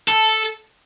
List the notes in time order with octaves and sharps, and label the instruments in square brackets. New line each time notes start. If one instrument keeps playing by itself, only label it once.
[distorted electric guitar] A4